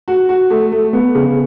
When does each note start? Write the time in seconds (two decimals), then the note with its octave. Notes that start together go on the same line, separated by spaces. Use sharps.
0.08 F#4
0.29 F#4
0.50 A3
0.72 A3
0.93 B3
1.15 C#3